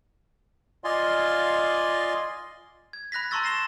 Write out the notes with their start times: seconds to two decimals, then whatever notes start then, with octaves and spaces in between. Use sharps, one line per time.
0.84 F4 D5 D#5 F5 G#5 C6
2.93 G#6
3.12 B5 F#6 A#6 B6
3.31 A5 A#5 C6 C#6 E6 A6
3.44 A#6 C7 E7 G7